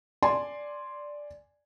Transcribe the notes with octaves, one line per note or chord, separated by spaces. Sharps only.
D5 G#5 A5 C6